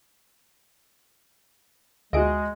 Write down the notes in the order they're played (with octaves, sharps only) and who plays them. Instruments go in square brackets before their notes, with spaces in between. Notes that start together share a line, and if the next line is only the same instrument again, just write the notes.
[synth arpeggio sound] D2 E5 D7 [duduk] G#3 [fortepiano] F#4 G#4 D#5